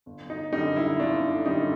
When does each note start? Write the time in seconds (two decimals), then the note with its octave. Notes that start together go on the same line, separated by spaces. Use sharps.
0.06 G1
0.30 D#4
0.52 F#2 D3 G3 D#4
0.76 E4
0.99 G1 D4
1.46 F#2 D3 G3 D#4